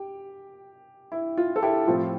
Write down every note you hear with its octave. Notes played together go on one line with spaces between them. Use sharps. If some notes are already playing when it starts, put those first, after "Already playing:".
Already playing: G4
E4
F4
A4
E4 G4
A2 F3 C4 F4